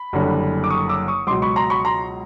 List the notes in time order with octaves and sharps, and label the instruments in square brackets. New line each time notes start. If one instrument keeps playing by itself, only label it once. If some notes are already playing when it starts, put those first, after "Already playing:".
Already playing: [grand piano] B5
F#1 F#2 D3 G3
D6
C#6 D#6
D6 E6
C#6 D#6
C#2 B2 F#3 C6 D6
B5 C#6
A#5 C6
B5 C#6
A#5 C6